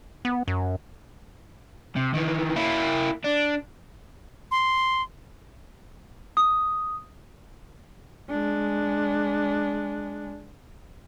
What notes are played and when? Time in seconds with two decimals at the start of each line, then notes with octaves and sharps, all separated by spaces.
0.25 B3
0.48 F#2
1.96 C3
2.14 D#3 E3
2.56 A#3 E4
3.24 D4
4.51 C6
6.37 D#6
8.29 G#3 D4